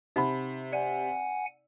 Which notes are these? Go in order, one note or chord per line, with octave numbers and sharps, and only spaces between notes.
C3 D#4 F#5 B5
D5 F#5 G#5